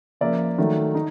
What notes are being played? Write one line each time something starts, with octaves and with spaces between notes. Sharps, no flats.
C#3 F3 A#3 D5 E5
D#3 F#3 A3
D#4